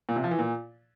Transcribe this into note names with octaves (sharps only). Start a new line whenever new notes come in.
A#2
C3
F3
E3
A#2